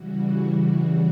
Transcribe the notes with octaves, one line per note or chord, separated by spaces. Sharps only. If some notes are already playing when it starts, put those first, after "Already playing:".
Already playing: C#3 E3 G3 F#4